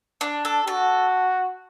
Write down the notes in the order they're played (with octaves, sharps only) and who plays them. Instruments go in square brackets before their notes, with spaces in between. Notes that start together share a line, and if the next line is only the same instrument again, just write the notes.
[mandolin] D4
A4
[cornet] F#4 [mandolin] A4